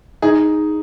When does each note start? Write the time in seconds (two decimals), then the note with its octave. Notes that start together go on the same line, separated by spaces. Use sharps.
0.22 D#4 G#4